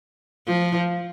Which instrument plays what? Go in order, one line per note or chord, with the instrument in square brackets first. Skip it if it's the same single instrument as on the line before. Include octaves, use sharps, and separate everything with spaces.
[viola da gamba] F3